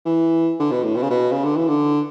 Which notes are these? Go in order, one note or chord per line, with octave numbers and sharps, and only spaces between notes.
E3
D3
B2
A2
B2
C#3
B2
C#3
D3
E3
D3